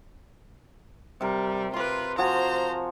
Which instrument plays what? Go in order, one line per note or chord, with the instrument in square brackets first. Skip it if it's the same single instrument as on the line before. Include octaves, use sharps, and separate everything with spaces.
[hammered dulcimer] C3 A#4 [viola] G3
[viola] F4 B4 [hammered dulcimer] C6 D6
[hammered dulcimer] F3 F#4 G#5 [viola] C5 A#5